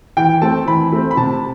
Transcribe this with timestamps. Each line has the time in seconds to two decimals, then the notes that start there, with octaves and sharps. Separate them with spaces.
0.17 E3 G5
0.42 A3 C4 A5
0.68 E3 B5
0.92 A3 C4
1.11 B5
1.17 C3 A5